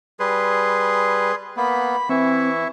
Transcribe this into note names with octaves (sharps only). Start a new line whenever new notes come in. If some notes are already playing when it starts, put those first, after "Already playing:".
G3 G#4 B4 C6
A#3 B3 B5
E3 C4 E4 E5 C#6